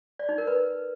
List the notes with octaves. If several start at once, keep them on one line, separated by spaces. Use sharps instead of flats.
D5
D#4
A#4
B4